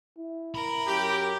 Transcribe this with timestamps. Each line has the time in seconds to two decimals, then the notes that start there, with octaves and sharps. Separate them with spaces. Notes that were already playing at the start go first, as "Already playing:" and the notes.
0.18 E4
0.55 A#4 B5
0.87 F#2 G4